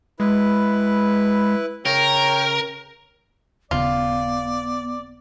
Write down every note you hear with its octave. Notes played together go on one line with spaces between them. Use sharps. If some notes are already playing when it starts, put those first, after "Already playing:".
G#3 E4 B4
C#3 A#4 C#5 G5
D#1 C#3 B3 F4 D5